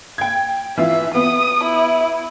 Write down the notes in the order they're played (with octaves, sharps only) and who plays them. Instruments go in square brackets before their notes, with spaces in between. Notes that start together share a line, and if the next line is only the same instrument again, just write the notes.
[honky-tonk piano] G5 G#6
[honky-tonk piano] E3 F4 [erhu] E5
[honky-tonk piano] B3 [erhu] D#6
[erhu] E4